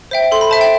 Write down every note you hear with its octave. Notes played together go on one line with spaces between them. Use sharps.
C5 E5 G5
A4 C6
B5
C5 E5 A5
G5